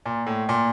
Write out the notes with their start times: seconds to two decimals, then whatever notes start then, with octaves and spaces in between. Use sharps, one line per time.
0.06 A#2
0.26 A2
0.49 A#2